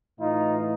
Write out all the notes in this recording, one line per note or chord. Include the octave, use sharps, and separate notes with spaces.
A2 E3 D#4 F4